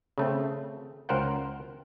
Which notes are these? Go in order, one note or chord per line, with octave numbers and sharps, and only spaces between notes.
C#3 A3 C4
C#2 A#4 C5 F#5 G5